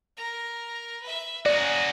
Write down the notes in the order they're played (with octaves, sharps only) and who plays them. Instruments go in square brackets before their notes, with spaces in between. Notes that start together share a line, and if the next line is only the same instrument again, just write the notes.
[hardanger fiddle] A#4 A#5
B4 E5
[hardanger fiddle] C#4 A#5 [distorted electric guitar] F#4 G#4 [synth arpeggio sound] D5